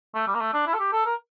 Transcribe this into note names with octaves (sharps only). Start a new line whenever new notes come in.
A3
G3
A#3
A3
D4
E4
A4
G4
A4
A#4